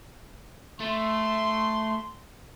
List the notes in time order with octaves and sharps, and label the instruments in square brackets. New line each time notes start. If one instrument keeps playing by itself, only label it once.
[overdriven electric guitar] A3 [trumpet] C6